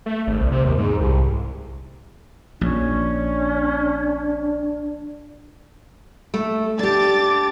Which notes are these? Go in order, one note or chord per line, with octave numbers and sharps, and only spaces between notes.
A3
G#1
C2
C3
D#2
G#2
C2
A#1 C#4 D4
A3
D4 G4 D6 A6